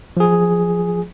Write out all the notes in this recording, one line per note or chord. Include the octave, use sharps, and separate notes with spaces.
F3 G#4